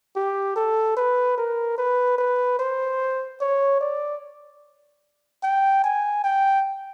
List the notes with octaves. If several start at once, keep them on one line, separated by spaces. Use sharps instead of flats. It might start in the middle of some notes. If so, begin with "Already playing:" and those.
G4
A4
B4
A#4
B4
B4
C5
C#5
D5
G5
G#5
G5